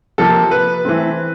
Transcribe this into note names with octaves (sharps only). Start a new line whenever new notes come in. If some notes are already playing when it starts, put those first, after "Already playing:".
C3 F3 A#3 A4
B4
E3 A3 C4